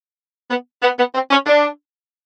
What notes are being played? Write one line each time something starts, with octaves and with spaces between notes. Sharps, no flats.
B3
B3
B3
C4
C#4
D4